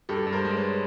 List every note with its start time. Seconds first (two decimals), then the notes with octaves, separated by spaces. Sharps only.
0.09 G2 G4 A4
0.27 G2
0.33 A#4 C5
0.45 G#3
0.57 B4 C#5